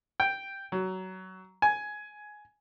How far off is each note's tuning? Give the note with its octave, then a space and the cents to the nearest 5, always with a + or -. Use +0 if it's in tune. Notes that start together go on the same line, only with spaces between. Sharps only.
G5 +0
F#3 +20
G#5 +10